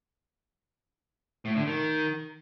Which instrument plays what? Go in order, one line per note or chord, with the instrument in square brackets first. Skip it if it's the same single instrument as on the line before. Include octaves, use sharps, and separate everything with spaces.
[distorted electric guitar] A2
D3
D#3